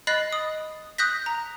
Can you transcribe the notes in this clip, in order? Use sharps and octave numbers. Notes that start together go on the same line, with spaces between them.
D#5 B5 F#6 A6 C7 F#7
D#6
D#6 F#6 G6 A#6 B6
A#5